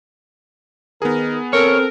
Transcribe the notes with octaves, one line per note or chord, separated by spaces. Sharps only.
D#3 B3 G#4 A#4
C4 A4 A#4 C#5